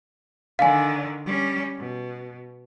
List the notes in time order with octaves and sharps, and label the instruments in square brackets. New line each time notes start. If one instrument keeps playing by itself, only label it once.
[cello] D3 D#3 [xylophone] F5 G#5
[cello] G3 C#4
B2